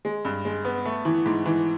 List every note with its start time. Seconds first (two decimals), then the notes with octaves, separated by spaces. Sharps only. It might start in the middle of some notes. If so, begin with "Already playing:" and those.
0.05 G#3
0.25 G2
0.45 G#3
0.65 B3
0.86 A3
1.05 E3
1.26 G#2
1.46 E3